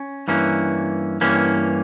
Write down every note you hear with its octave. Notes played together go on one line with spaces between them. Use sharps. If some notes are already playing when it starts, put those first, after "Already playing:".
Already playing: C#4
G2 E3 A#3 C#4
G2 E3 A#3 C#4